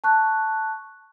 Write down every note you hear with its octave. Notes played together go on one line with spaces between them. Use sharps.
A5 C#6 F#6